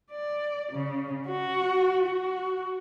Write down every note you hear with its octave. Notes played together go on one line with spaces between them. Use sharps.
D5
C#3
F#4
F#4